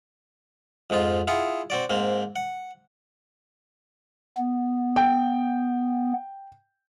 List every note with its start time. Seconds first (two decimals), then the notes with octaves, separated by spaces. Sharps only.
0.90 F2 G#2 D#4 F4
1.28 E4 F4 G#4 F#5
1.70 C4 F#4 D5
1.90 G#2 A#3 C4
2.36 F#5
4.37 B3
4.96 G5